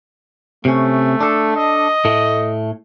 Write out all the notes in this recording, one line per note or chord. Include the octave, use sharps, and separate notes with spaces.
C3 A3 C#4
D4 A4
D#5
A2 A3